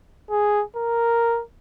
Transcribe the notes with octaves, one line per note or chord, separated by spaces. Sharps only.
G#4
A#4